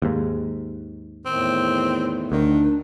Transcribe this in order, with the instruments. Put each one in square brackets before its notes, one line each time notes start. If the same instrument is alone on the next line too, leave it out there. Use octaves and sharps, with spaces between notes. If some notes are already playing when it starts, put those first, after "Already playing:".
[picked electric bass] D#2 G#2
[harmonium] E2 A2 D#3 [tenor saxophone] C4
[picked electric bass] D2 [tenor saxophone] D#3 [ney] D4